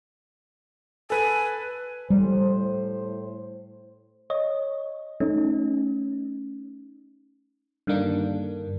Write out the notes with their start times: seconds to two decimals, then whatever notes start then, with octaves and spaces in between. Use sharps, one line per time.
1.10 A4 B4 G#5
2.10 A2 G3 C5
4.30 C#5 D#5
5.20 A3 C#4 D#4
7.87 G2 D3 D#3 A#3 D4